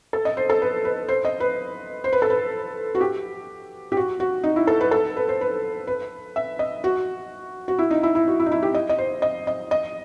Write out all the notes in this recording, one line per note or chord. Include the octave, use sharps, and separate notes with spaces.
A4
D#5
C5
A4
B4
B4
C5
D#5
B4
C5
B4
A4
B4
F#4
G4
G4
F#4
F#4
D#4
E4
A4
B4
A4
B4
C5
B4
B4
E5
D#5
F#4
F#4
E4
D#4
E4
E4
F#4
E4
D#4
E4
G4
D#5
D#5
C5
D#5
D#5
D#5